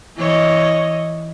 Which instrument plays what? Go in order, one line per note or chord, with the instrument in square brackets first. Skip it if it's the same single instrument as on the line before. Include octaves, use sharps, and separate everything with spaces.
[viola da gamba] E3 C#5 D#5